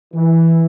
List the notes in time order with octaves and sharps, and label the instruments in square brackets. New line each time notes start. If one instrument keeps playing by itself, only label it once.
[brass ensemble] E3